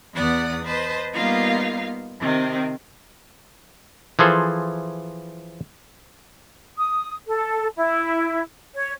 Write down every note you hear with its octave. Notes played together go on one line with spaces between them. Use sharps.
E2 B3 D5 F#5 D#6
B4 C5 D#5 A5
G3 A#3 B3 D#4 F4 F5
C3 D#3 C4
E3 F3 G#4 A4 C5
D#6
A4
E4
C#5